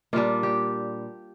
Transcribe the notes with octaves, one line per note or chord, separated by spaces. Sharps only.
A#2 G3 D4 F4
G4